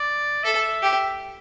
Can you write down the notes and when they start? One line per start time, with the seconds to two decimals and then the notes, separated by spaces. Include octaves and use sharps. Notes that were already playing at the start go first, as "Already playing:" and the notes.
Already playing: D5
0.44 A4 E5
0.83 G4